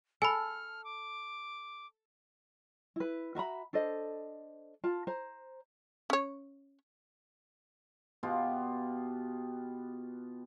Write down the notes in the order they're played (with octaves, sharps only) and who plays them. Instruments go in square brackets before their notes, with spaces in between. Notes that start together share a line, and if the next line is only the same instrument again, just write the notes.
[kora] A4 [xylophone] G#5 B5 [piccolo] F6
[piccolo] D6
[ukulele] E4 B4
F#4 E5 A#5 B5
D4 A4 C5 D#5
F4 A5
C5 A#5
[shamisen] C#4 C#5
[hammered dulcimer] B2 B3 F4 G4